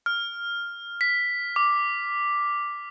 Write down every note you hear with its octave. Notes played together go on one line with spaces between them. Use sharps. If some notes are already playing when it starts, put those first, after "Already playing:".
F6
B6
D6